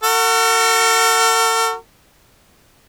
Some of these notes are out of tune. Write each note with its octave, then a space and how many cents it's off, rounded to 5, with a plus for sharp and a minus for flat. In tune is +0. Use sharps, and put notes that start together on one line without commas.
F#4 +0 A4 +45